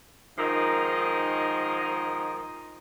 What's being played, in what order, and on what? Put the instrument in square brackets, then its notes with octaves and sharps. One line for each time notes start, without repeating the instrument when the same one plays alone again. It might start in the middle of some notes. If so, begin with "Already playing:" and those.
[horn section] G#2 D#3 F3 A#4 D#5